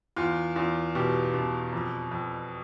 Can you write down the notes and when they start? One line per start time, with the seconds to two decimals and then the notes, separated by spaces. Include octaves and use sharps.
0.16 E2 F4
0.56 E2 F4
0.95 B2 G4
1.34 B2
1.73 F2
2.11 F2